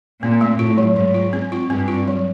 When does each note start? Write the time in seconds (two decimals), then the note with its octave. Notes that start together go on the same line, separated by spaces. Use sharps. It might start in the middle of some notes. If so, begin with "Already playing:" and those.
0.22 A#2 C4
0.41 A3
0.59 A2 F4
0.78 F#3
0.96 G#2 F#3
1.14 F4
1.33 C4
1.52 F4
1.70 G2 C4
1.88 F4
2.07 F#3